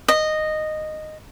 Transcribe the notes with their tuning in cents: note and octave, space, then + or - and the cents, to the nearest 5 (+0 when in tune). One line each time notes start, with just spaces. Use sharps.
D#5 -10